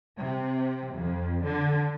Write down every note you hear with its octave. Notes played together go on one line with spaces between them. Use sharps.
C3
F2
D3